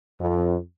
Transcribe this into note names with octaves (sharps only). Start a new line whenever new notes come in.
F2